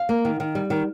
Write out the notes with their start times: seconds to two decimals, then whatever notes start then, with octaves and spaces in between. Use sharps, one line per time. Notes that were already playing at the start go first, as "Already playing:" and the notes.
Already playing: F5
0.09 A#3
0.25 D#3
0.40 D#3
0.55 G3
0.70 D#3